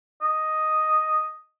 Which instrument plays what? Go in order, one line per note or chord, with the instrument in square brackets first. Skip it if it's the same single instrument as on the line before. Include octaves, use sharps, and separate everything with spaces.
[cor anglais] D#5